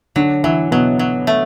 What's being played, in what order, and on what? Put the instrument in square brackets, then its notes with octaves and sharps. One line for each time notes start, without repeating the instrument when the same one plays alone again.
[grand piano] D3 D4 [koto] F#3
[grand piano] E3 E4 [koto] F#3
[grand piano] B2 B3 [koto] F#3
[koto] F#3
A3